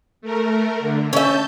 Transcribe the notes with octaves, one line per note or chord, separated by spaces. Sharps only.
A3 A#4
D3
C#4 E5 A5 G6